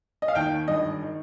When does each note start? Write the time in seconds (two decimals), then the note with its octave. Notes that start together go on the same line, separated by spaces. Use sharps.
0.22 D#5
0.28 F5
0.35 D#2 D#3 G5
0.68 G#1 G2 D#3 D#5
1.03 D#3